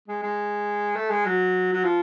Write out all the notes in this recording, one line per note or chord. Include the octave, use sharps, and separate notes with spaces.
G#3
G#3
A3
G#3
F#3
F#3
F3